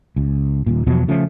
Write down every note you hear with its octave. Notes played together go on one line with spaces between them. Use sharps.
C#2
D#1 A#2
E2 B2 F3 F#3
C#3 F3 A3 C#4